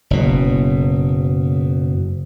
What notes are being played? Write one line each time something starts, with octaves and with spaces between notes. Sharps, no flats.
F#1 B2